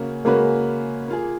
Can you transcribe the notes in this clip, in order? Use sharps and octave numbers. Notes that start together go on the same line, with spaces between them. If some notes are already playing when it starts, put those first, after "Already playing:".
Already playing: C#3 A#3 C#4 F#4
C#3 G#3 A#3 C#4 F#4 B4
A#3 F4 G#4